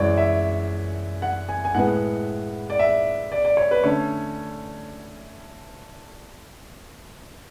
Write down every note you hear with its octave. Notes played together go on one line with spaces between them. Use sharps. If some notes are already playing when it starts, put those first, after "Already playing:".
Already playing: F#2 E3 G#3 C#5 D5
E5
F#5
G#5
G#5
A2 G#3 B3 F#5
D5
E5
D5
D5
C#5
B4
D3 A3 C#4 C#5